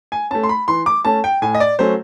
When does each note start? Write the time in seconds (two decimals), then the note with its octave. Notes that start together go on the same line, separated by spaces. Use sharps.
0.12 G#5
0.31 A3 C#4 A5
0.43 C6
0.49 B5
0.68 E3 C6
0.86 D6
1.05 A3 C#4 A5
1.24 G5
1.42 A2 G#5
1.55 D#5
1.60 D5
1.79 F#3 A3 C#4 C5